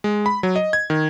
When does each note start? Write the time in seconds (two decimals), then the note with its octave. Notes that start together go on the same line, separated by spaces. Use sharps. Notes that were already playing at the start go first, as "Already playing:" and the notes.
0.04 G#3
0.26 B5
0.43 F#3
0.56 D#5
0.73 G#6
0.90 D#3